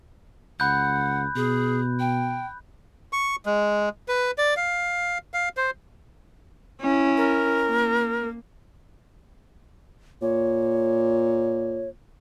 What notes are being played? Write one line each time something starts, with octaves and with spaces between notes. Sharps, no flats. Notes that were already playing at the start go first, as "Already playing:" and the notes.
C#2 F#5 B5 F#6 G6
B2 G#4
G5
C#6
G#3
B4
D5
F5
F5
C5
C#4 E4
A#4
A#3
A#2 C#5